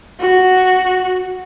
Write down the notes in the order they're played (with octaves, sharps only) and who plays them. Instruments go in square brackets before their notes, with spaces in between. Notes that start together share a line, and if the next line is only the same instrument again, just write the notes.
[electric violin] F#4